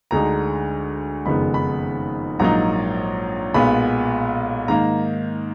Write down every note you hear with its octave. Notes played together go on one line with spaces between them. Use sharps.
D2 D3 G#3 D#4 A#5
F#1 F2 D#3 G#3 B3 B5
B5
A#1 G#2 F#3 A#3 D#4 A#5
B1 A#2 G#3 B3 B5
G#2 D#3 A#3 A#5